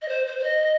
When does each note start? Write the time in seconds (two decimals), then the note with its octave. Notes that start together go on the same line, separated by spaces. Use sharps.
0.02 D#5
0.08 C5
0.26 C5
0.39 C5
0.43 D#5